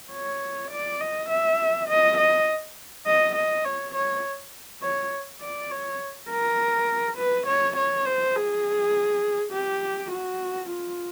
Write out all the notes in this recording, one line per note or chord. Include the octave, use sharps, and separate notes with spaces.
C#5
D5
D#5
E5
D#5
D#5
D#5
D#5
C#5
C#5
C#5
D5
C#5
A#4
B4
C#5
C#5
C5
G#4
G4
F#4
F4